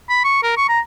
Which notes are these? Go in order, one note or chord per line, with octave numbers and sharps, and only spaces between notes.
B5
C#6
A#4
C#6
A#5